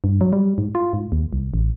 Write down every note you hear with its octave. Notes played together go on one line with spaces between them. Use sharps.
G2
F#3
G3
G#2
F4
G#2
D#2
C2
A1